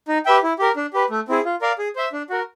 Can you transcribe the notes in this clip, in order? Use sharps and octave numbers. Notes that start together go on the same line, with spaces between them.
D#4
G4 B4 E5 G5
E4
G4 A#4
D4
G4 B4
A3
C4 E4 G#4
F4
A#4 D5 F5
G#4
C5 E5
D4
F#4 A#4